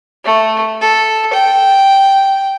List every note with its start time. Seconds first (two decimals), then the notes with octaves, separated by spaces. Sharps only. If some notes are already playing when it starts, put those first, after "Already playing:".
0.25 A3
0.81 A4
1.33 G5